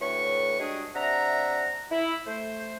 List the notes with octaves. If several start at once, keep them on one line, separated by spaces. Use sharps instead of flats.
D2 A2 B4 C#5 C#6
G3 G#3 D4 F#4 G#4 D#5
C3 D4 E5 F#5 A#5
E4
A3 C5